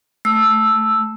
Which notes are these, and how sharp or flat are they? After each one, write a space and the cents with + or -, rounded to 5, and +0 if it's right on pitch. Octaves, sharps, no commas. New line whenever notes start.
A3 +0 E6 +0